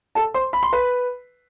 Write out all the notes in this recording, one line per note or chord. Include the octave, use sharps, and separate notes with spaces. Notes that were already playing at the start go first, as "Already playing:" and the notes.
A4 A5
C5 C6
B5
C6
B4 B5